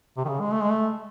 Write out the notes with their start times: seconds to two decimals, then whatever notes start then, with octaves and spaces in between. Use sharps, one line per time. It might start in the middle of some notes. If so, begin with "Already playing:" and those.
0.18 C3
0.25 D#3
0.29 C#3
0.41 G#3
0.53 A3
0.62 G#3
0.70 A3